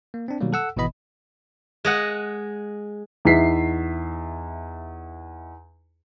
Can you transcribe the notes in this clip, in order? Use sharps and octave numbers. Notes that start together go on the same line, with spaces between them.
A#3
C4 D4
B2 D#3 F#3 G3 A#3
A4 F#5 E6
G#1 B2 E3 B3 D#5 B5
G#3 D#5 F#5
E2 D#4 E4 E5 B6 C7